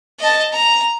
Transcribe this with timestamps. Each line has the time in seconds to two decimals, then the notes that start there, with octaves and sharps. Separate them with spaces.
0.19 D#5 A5
0.52 A#5